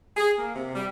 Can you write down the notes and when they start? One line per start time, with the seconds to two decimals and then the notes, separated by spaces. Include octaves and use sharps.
0.16 G#4
0.38 A#3
0.55 C3
0.74 G3